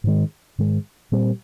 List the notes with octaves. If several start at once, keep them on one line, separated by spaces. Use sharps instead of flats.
G#2 D#3 G#3
G#2 D#3 G#3
A#2 G3 C4